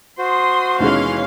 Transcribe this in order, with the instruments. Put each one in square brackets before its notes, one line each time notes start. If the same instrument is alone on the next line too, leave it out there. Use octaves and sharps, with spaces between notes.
[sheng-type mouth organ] F#4 C5 [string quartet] C6 D#6
[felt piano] D#2 B2 G#3 [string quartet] E3 C6 [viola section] C#4 F5